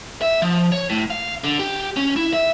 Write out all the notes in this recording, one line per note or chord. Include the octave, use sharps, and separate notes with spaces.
E5
F3
C#5
A2
F5
D3
G4
C#4
E4
E5